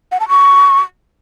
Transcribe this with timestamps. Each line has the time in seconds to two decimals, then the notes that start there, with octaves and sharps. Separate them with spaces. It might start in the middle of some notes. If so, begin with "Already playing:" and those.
0.12 F#5
0.20 A5
0.29 C#6